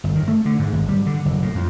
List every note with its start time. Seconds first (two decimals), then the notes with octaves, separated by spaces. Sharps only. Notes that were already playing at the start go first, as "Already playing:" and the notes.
0.04 G1
0.15 D#3
0.28 A3
0.45 D3
0.59 G#2
0.73 G#1
0.88 G3
1.06 D3
1.25 F#1
1.42 A2
1.55 F2